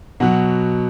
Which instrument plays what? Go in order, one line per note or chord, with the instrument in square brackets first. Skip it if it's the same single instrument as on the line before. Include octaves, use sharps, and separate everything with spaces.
[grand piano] B2 F#3 F#5